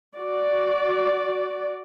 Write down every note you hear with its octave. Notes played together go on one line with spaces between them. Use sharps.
F#4 D5